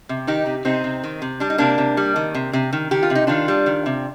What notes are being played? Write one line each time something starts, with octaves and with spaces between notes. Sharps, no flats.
C3
D#3 D#4 G4
C3
C3 C4 D#4
C3
D#3
C3
G3 D4
D#4
C3 A#3 D4
C3
G3
D#3
C3
C3
D#3
D#3 G4
F4
C3
D#4
D#3 D4 F4
G3
D#3
C3